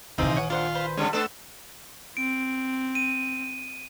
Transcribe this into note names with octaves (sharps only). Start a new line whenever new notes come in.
A#1 C3 D#3 E3 C4 D#4 F4 A#4
C#5 F#5 D#6
A#2 D4 F4 C5 F#5
B4 C5
B2 D3 G3 G#3 C#4
A3 B3 D4 A4 A5 E6
C4 D7
D#7